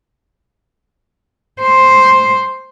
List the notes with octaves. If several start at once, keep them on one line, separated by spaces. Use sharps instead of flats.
C5